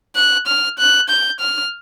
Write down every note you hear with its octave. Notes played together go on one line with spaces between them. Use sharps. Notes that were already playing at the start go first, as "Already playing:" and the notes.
F#6
F6
F#6
G6
F6